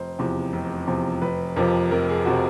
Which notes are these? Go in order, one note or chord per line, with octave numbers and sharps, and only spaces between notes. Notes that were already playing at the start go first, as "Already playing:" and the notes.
Already playing: F1 C5
E2 C3 F3
F1
E2 C3 F3
F1 B4
F2 C3 F3 A#4
F1 A#4
G#4
C3 F3 F#4